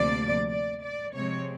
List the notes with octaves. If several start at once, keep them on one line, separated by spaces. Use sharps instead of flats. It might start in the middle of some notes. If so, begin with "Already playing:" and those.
Already playing: D2 C3 F3 A#3 D5
D5
D5
C3 F3 G#3 C4 C#5